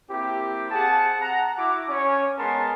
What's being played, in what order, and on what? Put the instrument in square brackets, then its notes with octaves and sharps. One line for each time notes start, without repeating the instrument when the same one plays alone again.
[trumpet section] A#3 C4 E4 G4
C4 G#4 F5 F#5 A5
F#5 A#5
E4 F#4 F#5 D6
C#4 C#5
G#3 B3 A#4 G#5 A5 C6